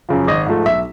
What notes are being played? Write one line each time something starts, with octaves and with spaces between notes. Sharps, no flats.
F#2 C#3 F3
G#1 D#5
G#2 F3 A3
B1 E5